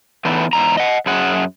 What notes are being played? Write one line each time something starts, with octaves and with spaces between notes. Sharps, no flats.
E3 A3 B3 D#4
E2 G#2 A#5
D#5 F#5
F#2 G#4 F#5